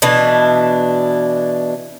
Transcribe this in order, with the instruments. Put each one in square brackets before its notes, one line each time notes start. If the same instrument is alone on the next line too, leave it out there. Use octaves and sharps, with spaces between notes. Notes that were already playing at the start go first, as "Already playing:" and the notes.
[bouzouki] B2 E3 D4